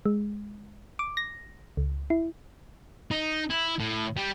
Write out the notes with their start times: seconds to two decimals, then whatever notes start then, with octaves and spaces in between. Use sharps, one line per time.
0.06 G#3
0.99 D6
1.17 A#6
1.77 C#2
2.10 E4
3.11 D#4
3.50 E4
3.80 A2
4.17 G3